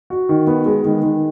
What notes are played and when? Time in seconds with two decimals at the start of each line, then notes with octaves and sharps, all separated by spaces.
0.10 F#4
0.29 D#3
0.47 B3
0.66 G#3
0.85 D#3
1.03 D#3